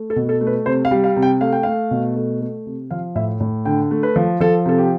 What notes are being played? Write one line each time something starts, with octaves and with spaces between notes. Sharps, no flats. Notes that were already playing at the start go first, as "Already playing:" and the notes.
Already playing: A3
A4
B2
A4
A3
B4
C3 C5
F5
G3
F5
C3
G5
A3 F5
G5
A3 F5
B2
A3
A3
C3
F3 F5
A2 E5
A2
D3 G5
A3
B4
F3
F3 A4
C3 A4
G4